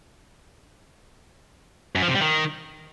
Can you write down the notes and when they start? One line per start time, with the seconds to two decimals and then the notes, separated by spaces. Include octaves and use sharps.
1.95 F#2
2.02 F3
2.08 C3
2.15 G3
2.21 D#3